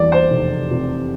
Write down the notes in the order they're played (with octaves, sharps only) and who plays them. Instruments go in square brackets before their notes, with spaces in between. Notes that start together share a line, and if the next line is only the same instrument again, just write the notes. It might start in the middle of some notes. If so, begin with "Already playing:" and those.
Already playing: [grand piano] E2 G3 [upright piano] D5
[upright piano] C5
[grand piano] F1
C3